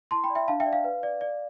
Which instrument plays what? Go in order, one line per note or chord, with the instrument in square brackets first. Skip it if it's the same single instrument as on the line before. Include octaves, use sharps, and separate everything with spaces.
[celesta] E4 A5 C6
G5 B5
D5
E5 G5
D4 F5 A5
E5 G5
D5
F5
B4
D5
D5